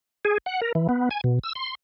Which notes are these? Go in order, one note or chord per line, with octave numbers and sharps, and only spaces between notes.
G#4
F#5
A#4
E3
B3
G#5
B2
E6
C6